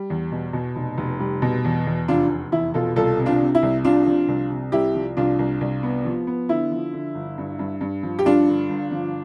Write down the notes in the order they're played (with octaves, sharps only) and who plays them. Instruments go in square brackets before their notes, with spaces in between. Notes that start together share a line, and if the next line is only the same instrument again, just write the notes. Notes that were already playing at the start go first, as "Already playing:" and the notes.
Already playing: [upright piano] G3
E2
B2
B2
F1
F1
G3
B2
E2
E2
F1 D4 F4
F1
E2 E4
B2 F4 A4
C2 F4 A4
C3
D4 F4
C3
E4
C2
C3 D4 F4
F3
C2
C3
C2 E4 G4
F3
C2 D4 F4
C2
C2
B3
F3
B3
D3 E4
F3
D3
G1
G2
G2
G2
F3
G4
G2 D4 F4
D3
G1
F3